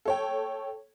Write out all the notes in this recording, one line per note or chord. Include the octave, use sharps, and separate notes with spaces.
A4 C#5 G5